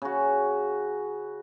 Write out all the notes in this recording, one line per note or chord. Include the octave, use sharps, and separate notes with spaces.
C#3 F#4